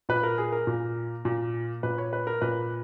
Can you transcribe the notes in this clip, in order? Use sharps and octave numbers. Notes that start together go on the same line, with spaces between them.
A#2 B4
A#4
G#4
A#4
A#2
A#2
A#2 B4
C#5
B4
A#4
A#2 B4